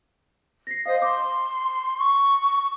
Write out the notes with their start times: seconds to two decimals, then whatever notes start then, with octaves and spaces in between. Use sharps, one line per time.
0.67 A#6 C7
0.86 C5 D#5 F5 D#6
1.02 C6 D6
1.97 C#6